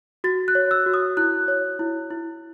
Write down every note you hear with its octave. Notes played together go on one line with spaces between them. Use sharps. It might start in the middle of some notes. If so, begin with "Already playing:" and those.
F#4 A6
F#6
C#5
E6
F#4
D#6
E4 F#6
C#5
E4
E4